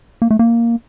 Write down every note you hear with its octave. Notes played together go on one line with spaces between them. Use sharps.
A#3
A3
A#3